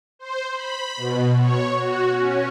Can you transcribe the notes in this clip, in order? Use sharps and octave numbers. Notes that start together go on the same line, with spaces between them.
C5
B5
B2
C#5
F#4
C#4